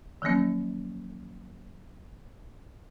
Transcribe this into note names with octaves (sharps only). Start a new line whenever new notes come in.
D#3 F3 F#3 A#3 C#4